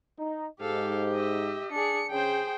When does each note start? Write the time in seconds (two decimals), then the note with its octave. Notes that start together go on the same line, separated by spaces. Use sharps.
0.18 D#4
0.61 G#2 G4 A4 F5
1.14 D#5 E5
1.72 D4 G#4 C#7
2.11 C#3 G#4 C5 G5